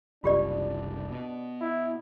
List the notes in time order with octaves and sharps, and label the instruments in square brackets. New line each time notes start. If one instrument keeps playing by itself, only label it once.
[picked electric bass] F#1 C2 F#2 [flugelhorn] D4 [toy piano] F4 G4 D5
[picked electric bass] B2
[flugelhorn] E4